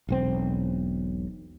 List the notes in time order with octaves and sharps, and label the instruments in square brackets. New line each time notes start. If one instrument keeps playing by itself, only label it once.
[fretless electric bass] E1 B1 C4